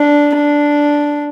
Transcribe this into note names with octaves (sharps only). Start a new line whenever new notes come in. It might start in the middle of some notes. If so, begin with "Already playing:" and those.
Already playing: D4
D4